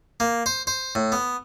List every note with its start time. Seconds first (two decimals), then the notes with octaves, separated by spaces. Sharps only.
0.20 A#3
0.46 C5
0.67 C5
0.95 A2
1.12 B3